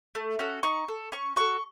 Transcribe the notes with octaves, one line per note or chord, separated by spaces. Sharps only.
A3
C#4 F#4 A4
D#4 C#6
A4
C#4 C#6
F#4 A4 C#6